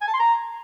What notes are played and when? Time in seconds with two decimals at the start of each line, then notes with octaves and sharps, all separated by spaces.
0.01 G#5
0.07 A5
0.13 C6
0.19 A#5